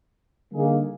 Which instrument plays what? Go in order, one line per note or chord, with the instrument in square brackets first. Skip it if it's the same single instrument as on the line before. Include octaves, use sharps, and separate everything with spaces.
[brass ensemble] D3 G3 A#3 D#4 G#4